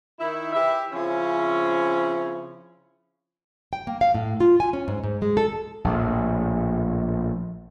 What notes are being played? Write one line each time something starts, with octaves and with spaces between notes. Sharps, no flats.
D#3 E4
E3 G4 E5
C#3 F3 C4 C#4 E4
G5
A#3
F5
A2
F4
G#5
C#4
G#2
G#2
G#3
A4
A#1 A2